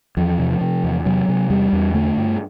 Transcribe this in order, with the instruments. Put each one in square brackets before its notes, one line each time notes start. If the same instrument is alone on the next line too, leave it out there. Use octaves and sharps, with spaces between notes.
[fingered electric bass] E2 F3
C3
C3
E2
C3 F#3
C3
E2 G3
E2
D3 A3
G2